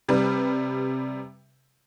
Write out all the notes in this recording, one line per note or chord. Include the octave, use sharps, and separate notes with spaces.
C3 G3 B4